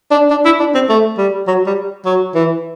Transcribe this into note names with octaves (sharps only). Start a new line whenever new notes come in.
D4
D4
E4
D4
C4
A3
G3
F#3
G3
F#3
E3